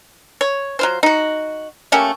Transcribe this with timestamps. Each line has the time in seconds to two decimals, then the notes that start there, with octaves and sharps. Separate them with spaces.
0.41 C#5
0.79 F#3 F4 C5
1.03 D#4 F#4
1.92 A3 A#3 C#4 G4